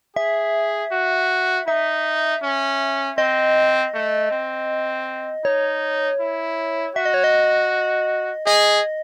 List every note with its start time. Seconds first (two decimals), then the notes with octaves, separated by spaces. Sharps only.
0.16 G#4 E5
0.92 F#4
1.67 D#4 E5
2.43 C#4
3.18 C4 D#5
3.94 A3
4.31 C4
5.45 D#4 C#5
6.20 E4
6.95 F#4 E5
7.05 D#5
7.14 C#5
7.24 D#5
8.46 G#4 D#5